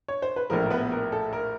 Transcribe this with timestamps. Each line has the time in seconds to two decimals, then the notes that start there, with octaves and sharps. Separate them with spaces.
0.08 C#5
0.22 C5
0.36 B4
0.50 A#1 A2 F3 A3 A#4
0.66 A#4
0.70 B3 B4
0.92 A#4
1.12 A4
1.33 A#4